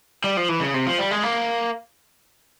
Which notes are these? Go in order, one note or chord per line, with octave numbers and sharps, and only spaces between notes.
G3
F3
E3
C#3
C3
F3
G3
G#3
A#3